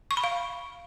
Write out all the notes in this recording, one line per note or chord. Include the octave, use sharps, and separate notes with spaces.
C#6
B5
F5